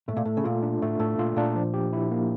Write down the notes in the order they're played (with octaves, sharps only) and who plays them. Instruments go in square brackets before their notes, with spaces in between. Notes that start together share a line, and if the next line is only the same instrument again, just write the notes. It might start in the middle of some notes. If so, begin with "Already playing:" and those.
[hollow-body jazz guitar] A2 [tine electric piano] A3
[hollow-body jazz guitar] A#2
[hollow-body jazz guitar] A2 [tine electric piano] A4
[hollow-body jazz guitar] C#3
[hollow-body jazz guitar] A#2 [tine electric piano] F4
[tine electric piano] D4
[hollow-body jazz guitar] A2 [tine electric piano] A3
[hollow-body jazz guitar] A2 [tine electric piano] A4
[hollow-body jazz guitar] A#2 [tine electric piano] F4
[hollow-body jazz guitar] A#2 [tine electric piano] D4
[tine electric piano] F3
G4
E4
A#3